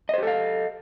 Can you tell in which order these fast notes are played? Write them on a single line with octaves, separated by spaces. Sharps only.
D#5 C5 G4 A4 F5